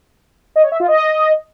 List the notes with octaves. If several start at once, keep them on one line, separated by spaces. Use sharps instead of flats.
D#5
C#5
E5
F4
D#5